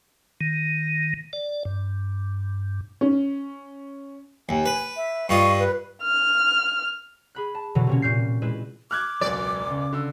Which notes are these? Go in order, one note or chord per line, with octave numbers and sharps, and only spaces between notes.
D#3
D5
G2
C#4
D#2 G#5
B4
E5
G2 F4 D#5 C#6
B4
F6
G#4 B5 F#6
A5
B2 D3 E3 F#3
C3 A#3 C#4
A#2 F6 G6 C7
G#3 E4 B4
D6 F6 F#6 G#6
E1 C#2 F#3 D5
C#3
D3 E6